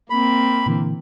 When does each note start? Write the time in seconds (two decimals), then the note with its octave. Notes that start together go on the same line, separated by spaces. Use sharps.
0.10 A#3 C4 B5
0.66 A#2 D3 E3